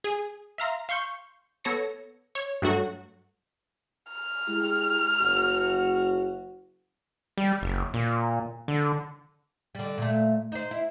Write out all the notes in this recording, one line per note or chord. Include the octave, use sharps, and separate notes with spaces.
G#4
E5 F5 A#5 C6
F5 C6 C#6 G6
B3 A4 C#5 A#6 C#7
C#5
G2 F#3 A3 D4 F#4
F6
G#3 E4 G4
F#1 F#4
G3
F#1
A#2
D3
D3 G3
A#2 A3
D#4 C5
E4